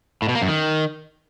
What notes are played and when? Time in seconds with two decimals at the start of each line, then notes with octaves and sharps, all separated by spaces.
0.22 A2
0.29 B2
0.35 A#3
0.42 F#2
0.48 D#3